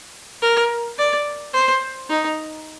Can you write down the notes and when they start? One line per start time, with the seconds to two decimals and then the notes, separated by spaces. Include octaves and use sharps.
0.42 A#4
0.98 D5
1.53 C5
2.09 D#4